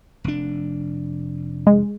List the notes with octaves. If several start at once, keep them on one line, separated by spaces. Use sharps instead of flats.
F1 D4
G#3